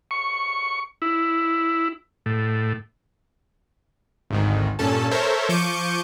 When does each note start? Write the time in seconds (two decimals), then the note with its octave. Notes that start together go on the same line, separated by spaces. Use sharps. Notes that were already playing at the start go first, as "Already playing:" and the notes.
0.11 C#6
1.02 E4
2.26 A2
4.30 G#1 D2 G#2 D#3
4.79 G2 A#2 C#4 A4 A5
5.11 A4 A#4 C5 C#5 E5
5.49 F3 C#6 D6 G6 C#7 D#7